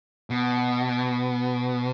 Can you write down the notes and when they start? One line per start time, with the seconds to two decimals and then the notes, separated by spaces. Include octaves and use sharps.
0.30 B2